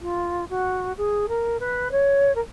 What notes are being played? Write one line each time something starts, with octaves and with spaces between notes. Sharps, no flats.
F4
F#4
G#4
A#4
B4
C#5
A#4